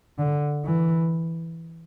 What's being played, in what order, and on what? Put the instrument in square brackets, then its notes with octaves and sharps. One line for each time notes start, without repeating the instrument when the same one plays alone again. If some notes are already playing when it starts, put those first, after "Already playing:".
[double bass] D3
E3